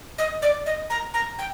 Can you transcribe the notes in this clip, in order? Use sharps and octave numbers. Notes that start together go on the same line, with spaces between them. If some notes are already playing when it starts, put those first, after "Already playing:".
D#5
D5
D#5
A#5
A#5
G5